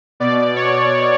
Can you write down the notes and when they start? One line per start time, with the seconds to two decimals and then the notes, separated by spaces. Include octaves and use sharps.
0.20 B2 D5
0.56 C#5